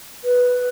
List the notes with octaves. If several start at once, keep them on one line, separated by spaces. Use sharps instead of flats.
B4